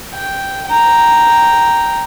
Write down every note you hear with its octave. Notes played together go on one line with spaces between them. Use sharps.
G5
G5 A#5